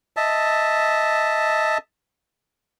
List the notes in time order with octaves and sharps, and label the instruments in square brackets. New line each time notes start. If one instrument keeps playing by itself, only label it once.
[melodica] D#5 E5 A5